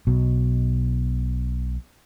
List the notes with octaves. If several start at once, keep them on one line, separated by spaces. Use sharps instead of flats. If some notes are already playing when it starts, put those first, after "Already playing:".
B1 B2